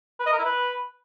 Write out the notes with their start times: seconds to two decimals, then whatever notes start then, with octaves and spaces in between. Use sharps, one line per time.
0.20 B4
0.26 D#5
0.32 A#4
0.39 E4
0.45 B4